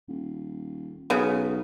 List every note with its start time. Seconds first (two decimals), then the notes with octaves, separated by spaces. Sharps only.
0.08 D#1
1.10 B1 C#3 B3